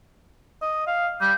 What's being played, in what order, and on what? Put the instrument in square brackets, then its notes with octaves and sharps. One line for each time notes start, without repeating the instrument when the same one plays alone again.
[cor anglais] D#5
F5
[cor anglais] G3 [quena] G6